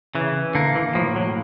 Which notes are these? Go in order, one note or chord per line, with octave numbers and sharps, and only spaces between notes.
C#3 E3
D3 A#3
E3
A2 F3
F#3